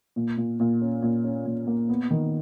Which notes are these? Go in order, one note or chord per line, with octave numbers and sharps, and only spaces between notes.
A#2
A#2
A#2
C#4
A#2
C#4
A#2
A#3
B3
D#3